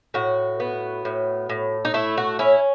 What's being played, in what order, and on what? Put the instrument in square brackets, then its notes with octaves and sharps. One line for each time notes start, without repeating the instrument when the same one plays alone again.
[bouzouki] A2 F#4
B3
A2
A2
D#4
A3 E4
F#4
C#4 E4